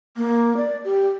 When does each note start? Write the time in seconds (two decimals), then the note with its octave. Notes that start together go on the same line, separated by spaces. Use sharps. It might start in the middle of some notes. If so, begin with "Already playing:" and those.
0.17 A#3
0.57 D5
0.85 G4